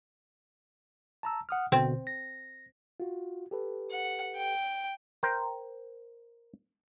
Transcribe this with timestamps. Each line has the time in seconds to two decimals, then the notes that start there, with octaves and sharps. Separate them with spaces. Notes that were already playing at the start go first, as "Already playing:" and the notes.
1.23 A5 A#5 E6
1.49 F#5 D#6 F6
1.72 G#1 B2 D3 C4
2.07 A#6
3.00 F4 F#4
3.51 G4 A4 B4
3.92 F#5
4.36 G5
5.23 A#4 C5 G5